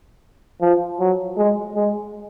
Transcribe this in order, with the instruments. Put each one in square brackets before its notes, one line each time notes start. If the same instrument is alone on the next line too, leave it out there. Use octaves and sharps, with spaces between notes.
[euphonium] F3
F#3
G#3
G#3